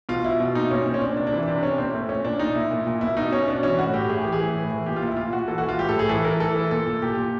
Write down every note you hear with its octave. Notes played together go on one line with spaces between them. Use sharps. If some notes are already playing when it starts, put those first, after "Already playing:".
B2 F4
B2 E4
B2
A#2 D#4
A#2 C#4
A#2 C4
C#4
A#2 D4
C3 D4
D4
E3
C3 D4
C3 C#4
A#2 C4
A#2 A3
A#2 C#4
A#2 D4
A#2 D#4
A#2 E4
A#2
A#2
B2 E4
B2 D#4
B2 C#4
B2 D4
E3 C#4
A2 F#4
A2 G4
A2 G#4
E3 G4
G#4
E3
A2
E3
A#2 G4
F4
A#2
E4
A#2 F4
A#2 F#4
E3 A4
F#4
E3
F4
A2 G4
A4
A2
G#4
E3 A4
E3 A#4
E3 A4
E3
A#2 A4
A#2
A#2 G4
A#2